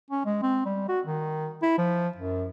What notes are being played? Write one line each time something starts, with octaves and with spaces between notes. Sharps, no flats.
C#4
G#3
C4
G3
F#4
D#3
E4
F3
F#2